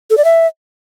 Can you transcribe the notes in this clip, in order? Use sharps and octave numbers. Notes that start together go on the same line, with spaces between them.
A4
D5
E5